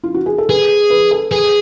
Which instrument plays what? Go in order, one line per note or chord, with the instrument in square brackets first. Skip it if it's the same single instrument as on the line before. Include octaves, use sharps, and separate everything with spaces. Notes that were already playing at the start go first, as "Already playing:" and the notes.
[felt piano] F4
F#4
G#4
A4
[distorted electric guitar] G#4 [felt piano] B4
[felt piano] B4
A4
[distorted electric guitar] G#4 [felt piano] B4